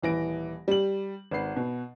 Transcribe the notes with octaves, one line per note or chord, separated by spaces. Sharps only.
D#1 E3 A#6 D7
G3 F#7
G#1 B4 C7
B2